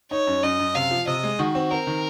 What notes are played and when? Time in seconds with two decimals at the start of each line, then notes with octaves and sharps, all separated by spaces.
0.11 D#4 C#5
0.27 F#2
0.43 F#2 D#5
0.59 F#2
0.75 C3 F5
0.91 F3
1.07 C3 D#5
1.24 G#3
1.39 D#3 F#4
1.55 C4
1.71 C4 A#4
1.87 D#3